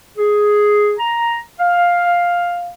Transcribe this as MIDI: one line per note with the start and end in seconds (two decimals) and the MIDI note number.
0.17 0.93 68
0.98 1.38 82
1.59 2.70 77